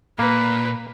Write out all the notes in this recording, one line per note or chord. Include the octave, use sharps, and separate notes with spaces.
A#2 A#3 B4